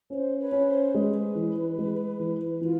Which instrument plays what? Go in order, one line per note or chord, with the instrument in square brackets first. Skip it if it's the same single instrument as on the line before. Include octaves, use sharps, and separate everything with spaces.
[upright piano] C#4 [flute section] C5
[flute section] B4 C#5
[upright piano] C#4
[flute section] C5
[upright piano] G#3 [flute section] B4
[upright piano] E3
G#3
E3
[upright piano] E3 [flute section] F4